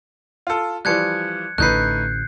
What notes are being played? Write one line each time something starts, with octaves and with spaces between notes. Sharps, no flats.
F4 A4
E3 F3 G3 F#6 G#6 C#7
A1 D3 A3 D#4 B4 F#6 G6 C7